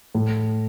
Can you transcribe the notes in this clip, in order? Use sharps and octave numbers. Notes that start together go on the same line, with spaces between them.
A2